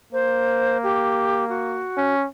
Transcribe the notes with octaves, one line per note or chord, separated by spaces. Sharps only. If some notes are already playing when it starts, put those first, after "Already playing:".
A#3 C5
G4
F#4
C#4